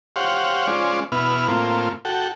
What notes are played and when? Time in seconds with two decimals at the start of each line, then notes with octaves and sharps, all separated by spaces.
0.16 G4 C5 C#5 F5 F#5
0.67 G#3 C#4 F4 C5 D5
1.12 B2 B3 E4 F6
1.48 A2 A#3 C4 F4
2.05 F#4 A4 G5